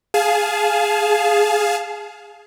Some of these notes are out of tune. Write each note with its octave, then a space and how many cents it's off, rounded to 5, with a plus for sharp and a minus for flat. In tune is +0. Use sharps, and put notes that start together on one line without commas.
G#4 +0 F5 +0 A5 -35